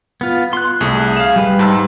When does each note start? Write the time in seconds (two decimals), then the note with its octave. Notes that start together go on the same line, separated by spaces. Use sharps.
0.21 B3 F4
0.53 C6 F#6
0.81 C2 A3 G#4
1.17 F5 E7
1.36 G3 B4
1.59 G#2 A5 E6